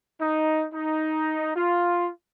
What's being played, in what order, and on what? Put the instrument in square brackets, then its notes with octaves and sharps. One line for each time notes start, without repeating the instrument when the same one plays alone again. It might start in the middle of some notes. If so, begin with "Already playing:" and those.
[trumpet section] D#4
D#4
F4